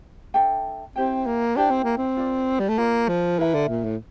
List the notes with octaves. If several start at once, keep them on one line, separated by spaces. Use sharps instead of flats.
D4 A4 E5 G5
C4 E4 G4 C5 G5
A#3
D4 E4 G4 C5 G5
C4
A#3
C4
F4 A#4 D5
G3
A3
A#3 F4 A#4 D5
F3
E3 A#4 E5 A#5
D3
A#2
A2